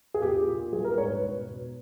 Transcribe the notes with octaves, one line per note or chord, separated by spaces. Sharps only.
G#4
A#2 G4
A#2
G3 G#4
A#4
G#2 C#5
B4
B2
B2